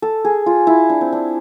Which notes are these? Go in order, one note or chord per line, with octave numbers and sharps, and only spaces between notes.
A4
G#4
F4
E4
D4
C4
D4